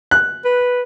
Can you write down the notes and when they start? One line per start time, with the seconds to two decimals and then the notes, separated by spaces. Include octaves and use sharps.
0.11 F#6
0.45 B4